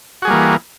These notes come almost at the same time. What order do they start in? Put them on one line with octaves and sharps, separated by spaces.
F#4 G#4 G3 A#3 E3